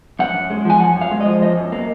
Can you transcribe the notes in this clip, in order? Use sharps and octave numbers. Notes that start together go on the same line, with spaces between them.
F#2 F#5
F#2
G#3
F3 G#5
F#2 F#5
F#2
F5
G#3
D#5
F3
F#2 D#5
F#2
A#3